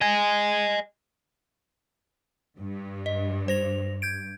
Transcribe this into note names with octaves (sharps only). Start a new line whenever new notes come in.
D#5 G#5
G2
D#5
C5 A#6 F7
G6 G#6 D7